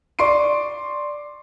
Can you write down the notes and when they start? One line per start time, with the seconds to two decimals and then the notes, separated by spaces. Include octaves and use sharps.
0.19 D5 C6 C#6 C7 D7